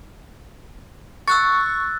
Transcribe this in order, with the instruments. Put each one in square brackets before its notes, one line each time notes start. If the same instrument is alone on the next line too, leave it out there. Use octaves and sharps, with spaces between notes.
[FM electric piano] C#6 [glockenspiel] E6 F#6 A6